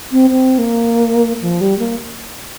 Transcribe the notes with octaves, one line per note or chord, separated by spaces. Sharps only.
C4
C4
A#3
F3
G3
A#3